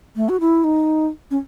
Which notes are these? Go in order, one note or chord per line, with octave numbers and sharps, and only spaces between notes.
A3
F#4
E4
D#4
C#4